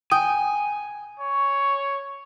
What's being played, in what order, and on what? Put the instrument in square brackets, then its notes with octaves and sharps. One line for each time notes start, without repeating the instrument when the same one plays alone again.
[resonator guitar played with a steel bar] G5 [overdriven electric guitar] G#5 [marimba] D#6
[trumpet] C#5